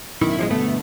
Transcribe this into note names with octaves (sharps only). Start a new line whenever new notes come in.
A1 F#2 B2 D#3 E4
F3 G3 G#3
G2 B2 D3 A3 B3